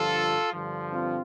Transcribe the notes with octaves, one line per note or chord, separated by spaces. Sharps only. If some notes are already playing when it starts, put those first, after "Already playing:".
Already playing: G2 D3 F3 F4 A4
G2 D3 F3
C4 F4